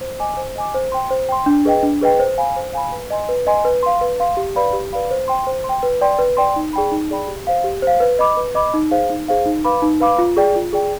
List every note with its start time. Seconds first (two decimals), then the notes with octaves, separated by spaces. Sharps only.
0.01 C5
0.20 D#5 G#5 D6
0.37 C5
0.56 D#5 G#5 D6
0.74 C5
0.92 G5 C6
1.11 C5
1.29 G5 C6
1.46 D4
1.65 G#4 B4 D#5 G5
1.83 D4
2.01 G#4 B4 D#5 G5
2.19 C5
2.38 F5 G#5 B5
2.56 C5
2.73 F5 G#5 B5
2.92 B4
3.10 D#5 G#5 C6
3.29 B4
3.47 D#5 G#5 C6
3.65 B4
3.83 F5 C6
4.01 B4
4.20 F5 C6
4.37 G4
4.56 B4 D5 F5 B5
4.73 G4
4.93 B4 D5 F5 B5
5.11 C5
5.28 G5 C6
5.47 C5
5.64 C6
5.69 G5
5.83 B4
6.01 D5 G5 C6
6.19 B4
6.37 D5 G5 C6
6.56 D#4
6.73 G#4 D5 G5 B5
6.92 D#4
7.11 G#4 D5 G5 B5
7.28 G4
7.47 C5 F5
7.64 G4
7.82 C5 F5
8.00 B4
8.19 D#5 B5 D6
8.37 B4
8.55 D#5 B5 D6
8.74 D#4
8.91 G#4 C5 F5
9.10 D#4
9.28 G#4 C5 F5
9.46 D#4
9.65 B4 F5 B5 D6
9.82 D#4
10.00 B4 F5 B5 D6
10.19 F4
10.37 G#4 D5 G5
10.56 F4
10.73 G#4 D5 G5